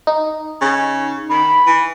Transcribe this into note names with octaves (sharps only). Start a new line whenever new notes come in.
D#4
C#3
D#3 B5
E3